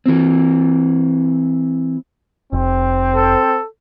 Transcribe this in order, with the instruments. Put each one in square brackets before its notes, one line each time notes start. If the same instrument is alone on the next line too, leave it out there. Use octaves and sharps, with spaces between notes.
[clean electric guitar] E3 C4
[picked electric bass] F1 [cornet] C4
[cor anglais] A4